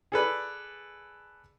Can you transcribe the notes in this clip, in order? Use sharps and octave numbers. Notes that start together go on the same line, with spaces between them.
G#4 A4 B4 D5